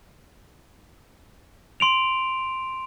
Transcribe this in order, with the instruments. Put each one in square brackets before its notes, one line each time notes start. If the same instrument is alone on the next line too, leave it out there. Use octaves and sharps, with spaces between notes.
[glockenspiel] C6 D7 F7